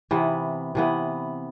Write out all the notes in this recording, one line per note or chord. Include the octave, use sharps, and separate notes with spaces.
C3 E3 B3
C3 E3 B3